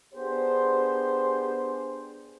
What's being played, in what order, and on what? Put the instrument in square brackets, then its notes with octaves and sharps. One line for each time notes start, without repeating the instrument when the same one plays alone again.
[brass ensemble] B3 D4 G4 G#4 C5